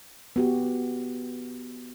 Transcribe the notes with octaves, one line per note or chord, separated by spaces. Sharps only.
B3 F#4 G4